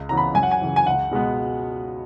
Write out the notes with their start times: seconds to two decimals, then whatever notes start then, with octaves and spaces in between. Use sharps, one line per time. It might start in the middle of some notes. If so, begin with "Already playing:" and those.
Already playing: C#2
0.09 C#3 E3 B3 A#5
0.17 B5
0.34 F#2 G#5
0.43 F#5
0.51 G#5
0.61 C#3 E3
0.76 G#5
0.87 C#2 F#5
1.11 B2 G#3 B3